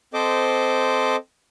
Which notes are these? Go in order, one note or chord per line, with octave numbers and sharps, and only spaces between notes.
C4 A4 C5 D#5 D6